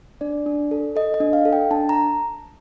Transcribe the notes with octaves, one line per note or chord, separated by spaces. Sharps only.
D4 D5
D4
A4
A4 D#5
D#5
D4
F5
A4
G5
D4 A5
A#5